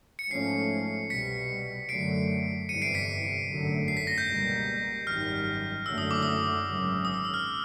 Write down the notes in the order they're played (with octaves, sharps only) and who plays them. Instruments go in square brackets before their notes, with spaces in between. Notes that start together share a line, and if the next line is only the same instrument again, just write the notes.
[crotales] C#7
[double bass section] G#2 F3 A3 C#4 [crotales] C7
[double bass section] C2 B2 G3 [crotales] B6 C#7
[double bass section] F#2 D3 F#3 A3 [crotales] C7 D7
[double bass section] G1 F2 C3 E3 G3 [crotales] C#7 D#7
[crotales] C7 D7
B6 C#7
[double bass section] G#1 F#2 D3 F#3 A3
[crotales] C7
B6
A#6
G6
[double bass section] C#2 B2 G3 A#3
[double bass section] G#1 F#2 D#3 G3 [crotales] F6
[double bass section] F#1 F#2 D3 F#3 A3 [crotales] E6
[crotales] D#6
D6
D#6
[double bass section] G#1 F#2 C#3
[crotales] D#6
E6
E6
F6